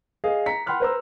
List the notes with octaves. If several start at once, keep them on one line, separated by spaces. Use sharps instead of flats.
G#4 D#5 F5
A#5 B6 C#7
F#5 G5 B5 C6 F6 F#6
B4 C5 A#5 E6